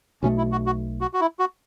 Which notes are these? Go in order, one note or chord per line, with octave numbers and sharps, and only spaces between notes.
B1 B2 A3 C#4
E4
F#4
F#4
F#4
F#4
E4
F#4